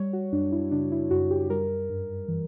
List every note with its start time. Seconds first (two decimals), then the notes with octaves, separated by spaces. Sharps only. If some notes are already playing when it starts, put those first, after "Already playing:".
Already playing: G3 C#5
0.13 F#4
0.32 F#2 D4
0.52 E4
0.71 C#3 D4
0.92 E4
1.11 F#2 F#4
1.31 G4
1.50 G3 A#4
1.89 G2
2.28 E3